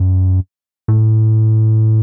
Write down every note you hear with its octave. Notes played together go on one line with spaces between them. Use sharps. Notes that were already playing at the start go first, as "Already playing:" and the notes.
Already playing: F#2
A2